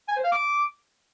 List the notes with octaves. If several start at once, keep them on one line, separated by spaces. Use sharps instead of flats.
G#5
C5
F5
D6